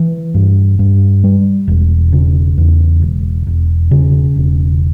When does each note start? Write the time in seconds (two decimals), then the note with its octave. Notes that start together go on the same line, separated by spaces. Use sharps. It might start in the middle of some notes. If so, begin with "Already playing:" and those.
Already playing: E3
0.34 G2
0.79 G2
1.24 G3
1.68 E1
2.12 C#3
2.58 E2
3.02 E1
3.47 E1
3.91 C#3
4.36 E1